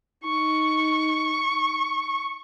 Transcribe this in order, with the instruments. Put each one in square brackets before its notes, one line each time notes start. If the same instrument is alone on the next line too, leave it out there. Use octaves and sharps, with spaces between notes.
[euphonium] D#4 [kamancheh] C#6